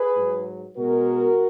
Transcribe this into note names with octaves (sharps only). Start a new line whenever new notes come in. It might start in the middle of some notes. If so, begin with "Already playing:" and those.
Already playing: G#4 B4
G#2 F#3
B2 G#3 F#4 A#4